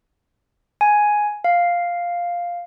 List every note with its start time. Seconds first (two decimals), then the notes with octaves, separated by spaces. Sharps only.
0.81 G#5
1.44 F5